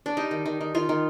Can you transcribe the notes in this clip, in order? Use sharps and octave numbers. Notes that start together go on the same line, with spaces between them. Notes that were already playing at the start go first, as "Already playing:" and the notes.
D4
G3 D#4
D#3
D#3
D#3
D#3 F4
D#3